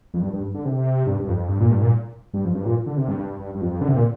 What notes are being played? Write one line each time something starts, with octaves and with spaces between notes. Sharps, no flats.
F2
G2
G2
D3
C3
G2
G2
F2
G2
A#2
G2
A#2
G2
F2
G2
A#2
D3
C3
G2
G2
G2
G2
F2
D3
C3
A#2